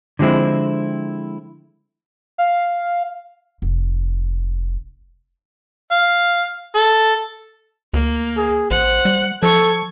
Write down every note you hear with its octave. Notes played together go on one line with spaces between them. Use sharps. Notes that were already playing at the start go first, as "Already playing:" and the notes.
D3 F3 G#3 C4 E4
F5
F1
F5
A4
D2 A#3
G#4
A1 C5 F#5
G3
F3 A4 C#6 G#6